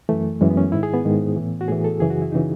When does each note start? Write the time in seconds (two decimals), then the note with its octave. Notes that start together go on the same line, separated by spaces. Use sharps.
0.09 F#2 E3 A3
0.41 F#2 E3 G#3
0.50 B3
0.57 C#4
0.72 G#2 D#3 E4
0.83 G#4
0.93 B3
1.05 G#2 D#3
1.37 A2 E3
1.61 F#4
1.68 A2 E3 G#4
1.84 A4
2.00 F#2 C#3 E3 G#4
2.10 F#4
2.22 E4
2.32 C#3 E3 D#4